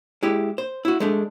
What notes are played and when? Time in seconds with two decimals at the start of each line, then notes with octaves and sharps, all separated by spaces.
0.23 G#3 E4 G4
0.58 C5
0.85 E4 F#4
1.00 G#3 A3 D4